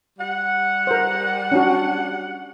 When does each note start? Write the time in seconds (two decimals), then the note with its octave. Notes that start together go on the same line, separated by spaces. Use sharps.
0.19 G3 F#5
0.87 A#4 C5
1.52 C#4 D4 F#4